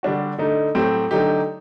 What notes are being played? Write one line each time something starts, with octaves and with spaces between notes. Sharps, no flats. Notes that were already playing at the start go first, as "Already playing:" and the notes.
D3 G3 D4 F#4
D3 A3 D#4
A2 F#3 A3 C4 G4
D3 F#3 A3 D#4 G4